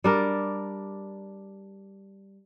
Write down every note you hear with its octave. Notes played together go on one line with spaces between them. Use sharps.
G3 D4 A#4